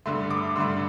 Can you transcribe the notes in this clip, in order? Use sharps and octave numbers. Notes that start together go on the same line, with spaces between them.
G2 D3 A3 C6
D6
G2 D3 A3 C6